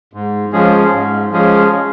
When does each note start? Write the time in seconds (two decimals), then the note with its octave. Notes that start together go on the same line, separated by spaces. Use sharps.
0.13 G#2
0.52 F3 G#3 C#4 G#4
0.93 G#2
1.31 F3 G#3 C#4 G#4